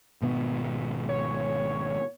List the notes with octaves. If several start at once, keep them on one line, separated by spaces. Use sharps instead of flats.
G#1 B2 B3
C#5